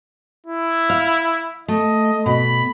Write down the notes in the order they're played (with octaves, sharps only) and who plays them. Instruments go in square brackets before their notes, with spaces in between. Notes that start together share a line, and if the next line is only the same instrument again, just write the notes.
[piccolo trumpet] E4
[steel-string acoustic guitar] F5
[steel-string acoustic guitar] A3 [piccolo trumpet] D#5
[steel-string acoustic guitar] B2 [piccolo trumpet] B5